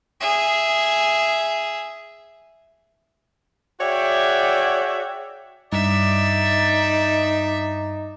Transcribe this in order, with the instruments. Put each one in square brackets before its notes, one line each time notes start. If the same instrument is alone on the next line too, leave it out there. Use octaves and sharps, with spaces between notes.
[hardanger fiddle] G#4 E5
[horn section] F#4 G#4 C#5 D5 E5 G5
[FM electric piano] G2 [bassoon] D#4 [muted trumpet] D5 [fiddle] E5